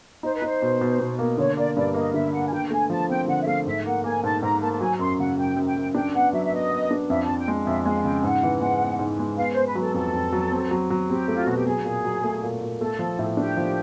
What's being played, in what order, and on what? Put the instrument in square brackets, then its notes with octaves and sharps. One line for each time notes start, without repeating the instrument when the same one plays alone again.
[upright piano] D#4 [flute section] C5
[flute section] B4
[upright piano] D#4 [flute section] C5
[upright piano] B2
B2
B2
A#3
[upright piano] D3 [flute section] C#5
[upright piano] A#3 [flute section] D5
[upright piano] G2 [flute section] D5
[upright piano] A#3 [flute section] D#5
[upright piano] D3 [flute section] E5
[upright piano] A#3 [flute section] F#5
[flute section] G#5
[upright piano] D3 [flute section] G5
[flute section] G5
[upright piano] A3 [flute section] G#5
[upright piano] F3 [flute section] A5
[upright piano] C4 [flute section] G5
[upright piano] D3 [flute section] F#5
[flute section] E5
[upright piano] A3 [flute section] F5
[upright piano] G#2 [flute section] E5
[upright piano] A#3 [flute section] F#5
[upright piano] A#3 [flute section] G#5
[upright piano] G#2 [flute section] A5
[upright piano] G#2 [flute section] A#5
[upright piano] A#3 [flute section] A5
[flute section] A5
[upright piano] F#3 [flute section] G#5
[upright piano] F#2 [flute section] C6
[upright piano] C#3 [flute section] F#5
[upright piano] F#2 [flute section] G5
[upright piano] F#2
[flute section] G5
[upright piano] F#2
[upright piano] D4 [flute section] G5
[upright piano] B3 [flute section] F#5
[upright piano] F#3 [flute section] E5
[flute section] E5
[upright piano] B3 [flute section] D#5
[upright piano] B3
D4
[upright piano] F2 [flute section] E5
[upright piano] F2 [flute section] A5
[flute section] G5
[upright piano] G#3
[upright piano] F2 [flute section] E5
[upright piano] G#3 [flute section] F5
[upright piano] C#3 [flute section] G5
[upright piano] G#2 [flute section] F#5
[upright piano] E3
G#3
B3
G#2
G#3
[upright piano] B3 [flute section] F5
[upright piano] B3 [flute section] C5
[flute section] B4
[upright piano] F#3
[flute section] A4
[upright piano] F2 [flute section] A4
[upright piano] F2
F#3
C4
F#3
F#3
[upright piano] C4 [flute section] G4
[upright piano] A3
[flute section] F4
[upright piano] B2 [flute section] F#4
[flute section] G4
[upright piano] F#3 [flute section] G#4
[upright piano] A#2
F#3
A3
A#2
A#2
[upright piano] A3 [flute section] A4
[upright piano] F3
A2
[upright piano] D4 [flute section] G4
[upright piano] F3